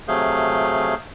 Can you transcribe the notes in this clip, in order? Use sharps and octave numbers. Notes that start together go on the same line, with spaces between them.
C3 F#3 A3 G#4 F5 G6